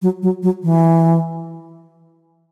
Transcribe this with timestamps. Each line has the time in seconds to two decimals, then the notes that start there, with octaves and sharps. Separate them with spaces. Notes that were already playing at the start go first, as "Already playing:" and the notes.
0.02 F#3
0.22 F#3
0.43 F#3
0.63 E3